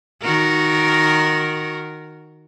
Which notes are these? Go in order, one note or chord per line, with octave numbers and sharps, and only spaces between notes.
D#3 F#4 A#4